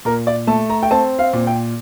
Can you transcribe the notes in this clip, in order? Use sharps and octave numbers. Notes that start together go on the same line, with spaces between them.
A#2 A#4
D5
A3 A5
A#5
G5
C4 A5
F5
A#2
G5